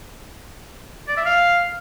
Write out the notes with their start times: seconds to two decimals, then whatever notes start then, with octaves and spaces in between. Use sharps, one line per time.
1.08 D5
1.17 E5
1.26 F5